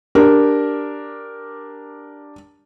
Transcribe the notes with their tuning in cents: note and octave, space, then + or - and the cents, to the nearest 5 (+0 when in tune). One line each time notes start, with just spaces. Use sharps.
D4 +0 G4 +0 A#4 +0